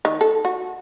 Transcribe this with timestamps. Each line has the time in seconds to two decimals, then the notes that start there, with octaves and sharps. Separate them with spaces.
0.05 D#3
0.21 A4
0.45 F#4